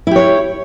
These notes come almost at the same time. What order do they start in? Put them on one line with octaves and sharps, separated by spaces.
E4 G4 C#5